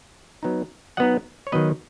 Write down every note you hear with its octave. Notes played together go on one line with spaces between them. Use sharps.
F#3 B3 D#4
F#3 B3 D#4 D#5 F#5
C#5
D#3 F#3 B3 B4 D#5